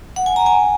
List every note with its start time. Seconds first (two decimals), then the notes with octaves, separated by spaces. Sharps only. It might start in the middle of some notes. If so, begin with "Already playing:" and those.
0.16 F#5
0.26 G#5
0.36 A#5
0.46 G#5